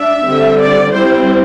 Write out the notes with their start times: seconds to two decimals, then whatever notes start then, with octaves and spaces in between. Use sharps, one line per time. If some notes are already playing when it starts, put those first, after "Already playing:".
Already playing: D4 E5
0.25 D3 G3 C4
0.59 D5
0.93 G3 C4 E4 C5